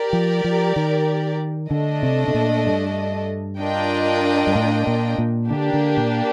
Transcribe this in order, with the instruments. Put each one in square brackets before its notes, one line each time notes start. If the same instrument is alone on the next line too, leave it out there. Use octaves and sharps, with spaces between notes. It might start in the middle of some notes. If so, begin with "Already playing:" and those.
Already playing: [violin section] G4 A#4 D5
[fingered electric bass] F3
F3
D#3
[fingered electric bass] D3 [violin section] A3 D4 A4 D#5
[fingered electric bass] C3
C3
A#2
G2
[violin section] D4 F4 A#4 D#5 G5
[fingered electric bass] G2
A2
A#2
A#2
[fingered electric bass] D3 [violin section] A#3 D4 G4
[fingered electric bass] D3
A#2